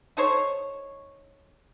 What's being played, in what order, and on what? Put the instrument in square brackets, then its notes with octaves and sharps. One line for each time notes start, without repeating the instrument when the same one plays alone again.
[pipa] D#4 A4 C5 C#5